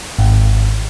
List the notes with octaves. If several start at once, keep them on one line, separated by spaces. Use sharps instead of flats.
G#1